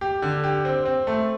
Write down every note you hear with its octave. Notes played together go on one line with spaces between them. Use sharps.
G4
D3
G4
C4
C4
A3